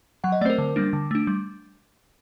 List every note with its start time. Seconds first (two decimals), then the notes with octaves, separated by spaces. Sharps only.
0.24 F#3 F#5
0.32 D#5
0.41 A3 D5
0.45 C4 C5
0.50 A#4
0.58 D3
0.76 G3 A#3 D4
0.93 D3
1.11 A3 D4
1.27 G3